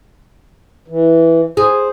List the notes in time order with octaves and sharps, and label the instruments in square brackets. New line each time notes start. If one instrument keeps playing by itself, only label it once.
[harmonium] E3
[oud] G#4 [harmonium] C5